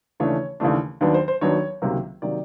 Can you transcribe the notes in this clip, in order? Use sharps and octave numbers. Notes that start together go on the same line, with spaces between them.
D#2 C#3 E3 A3 D4 C#5
D#2 C#3 E3 A3 D4
D#2 D#3 F#3 B3 D4
C5
C5
D#2 D#3 F#3 B3 D4 C#5
C#2 C3 D#3 F#3 A#3
C3 D#3 F#3 A#3 D5